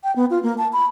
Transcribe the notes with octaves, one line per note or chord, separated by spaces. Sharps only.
G5
B3
F4
A#3
A5
B5